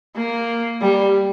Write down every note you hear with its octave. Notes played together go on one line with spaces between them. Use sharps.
A#3
G3